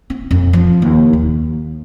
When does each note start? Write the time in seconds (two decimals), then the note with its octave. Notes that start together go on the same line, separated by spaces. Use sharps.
0.10 C4
0.31 F2
0.53 F3
0.82 D#2
1.13 D#2